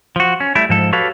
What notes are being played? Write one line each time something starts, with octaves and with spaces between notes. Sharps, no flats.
F3 F#4
C#4
G3 A3 E4
G#2 F3 A4
F#4 G4 A4 B4 C#5 F5